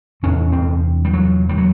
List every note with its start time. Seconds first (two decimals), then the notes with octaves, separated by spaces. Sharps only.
0.23 E2 C3 C#4
0.52 C4
1.05 G3
1.13 F#3
1.49 G3
1.58 F#3